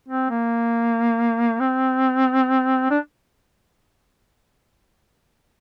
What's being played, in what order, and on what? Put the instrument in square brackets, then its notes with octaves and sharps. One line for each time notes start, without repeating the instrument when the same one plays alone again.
[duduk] C4
A#3
C4
D4